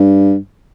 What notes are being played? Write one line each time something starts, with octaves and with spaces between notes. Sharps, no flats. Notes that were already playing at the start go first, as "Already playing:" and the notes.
Already playing: G2